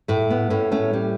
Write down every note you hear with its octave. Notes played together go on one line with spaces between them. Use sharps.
A2 A3
B3
A2 A3 C#4
A3 C#4
G3